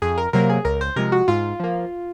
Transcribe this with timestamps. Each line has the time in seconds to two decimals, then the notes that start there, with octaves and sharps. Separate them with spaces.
0.02 F2 G#4
0.18 A#4
0.33 C3 F#3 A#3 A#4
0.50 G#4
0.65 C#2 A#4
0.81 C5
0.96 C3 F3 G#3 A#4
1.12 F#4
1.28 G#2 F4
1.60 F3 A#3